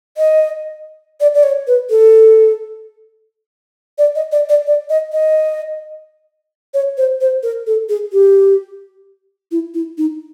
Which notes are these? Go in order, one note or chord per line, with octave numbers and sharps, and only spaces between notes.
D#5
D5
D5
C#5
B4
A4
D5
D#5
D5
D5
D5
D#5
D#5
C#5
C5
C5
A#4
A4
G#4
G4
E4
E4
D#4